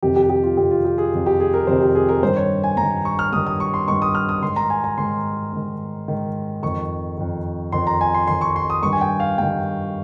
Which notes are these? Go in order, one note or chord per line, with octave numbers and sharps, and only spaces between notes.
F2 C3 D#3 G4
G4
G4
F4
F2 C3 D#3 G4
F4
G4
G#4
F2 C3 D#3
G4
G#4
A#4
F2 C3 D#3 C5
G4
G#4
A#4
G2 D#3 C5
C#5
G#5
G2 D#3 A#5
C#6
F6
G2 D#3 D#6
D#6
C#6
C6
G2 D#3 C#6
D#6
F6
D#6
G#2 D#3 C6
A#5
G#5
A#5
G#2 D#3 C6
G#2 D#3
G#2 D#3
F2 D#3 C#6
F2 D#3
F2 D#3 C6
A#5
G#5
C6
F2 D#3 C6
C#6
C6
D#6
G2 D#3 C#6
G#5
G5
F5
G2 D#3 G5